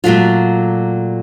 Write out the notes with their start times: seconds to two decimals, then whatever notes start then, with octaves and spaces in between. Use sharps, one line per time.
0.04 A#2 F#3 A3 D4 F4